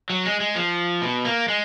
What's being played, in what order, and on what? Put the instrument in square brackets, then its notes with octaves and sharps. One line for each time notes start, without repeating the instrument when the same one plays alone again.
[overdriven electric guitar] F#3
G#3
G#3
F3
B2
A#3
G#3